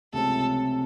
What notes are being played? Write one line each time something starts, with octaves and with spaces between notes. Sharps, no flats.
C#2 C3 F3 A3 C#4 A4